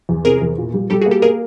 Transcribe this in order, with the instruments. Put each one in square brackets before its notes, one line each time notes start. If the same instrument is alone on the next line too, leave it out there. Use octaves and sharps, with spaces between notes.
[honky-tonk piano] E2
[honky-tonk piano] C3 [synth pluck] G#4 A#4
[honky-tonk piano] E2
A#2
G3
[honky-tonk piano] G3 [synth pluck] G4 A4
[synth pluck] F#4 G#4
[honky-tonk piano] A#3
[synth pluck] G4 A4
[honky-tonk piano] A#3 [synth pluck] G#4 A#4